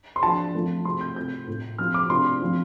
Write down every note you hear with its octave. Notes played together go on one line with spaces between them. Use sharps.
C6
F3 D4 F4 A5
F3 A3 C4 F4
C3 A3 C4 F4 C6
G6
C3 A3 F4 G6
A2 A3 F4
F3 C4 F4 F6
D6
C3 A3 D4 F4 C6
F3 C4 F4